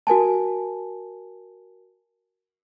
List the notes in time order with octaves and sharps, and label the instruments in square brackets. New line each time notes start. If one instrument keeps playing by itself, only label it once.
[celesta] F#4 A#4 G#5 A5